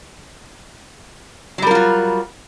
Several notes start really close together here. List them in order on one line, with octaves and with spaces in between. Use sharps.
F#3 G3 A#4 F4 F#4